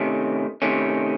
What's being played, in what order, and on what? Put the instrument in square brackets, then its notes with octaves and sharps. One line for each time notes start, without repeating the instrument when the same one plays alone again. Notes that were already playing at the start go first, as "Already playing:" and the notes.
Already playing: [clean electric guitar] C3 D#3 A3 C#4
C3 D#3 A3 C#4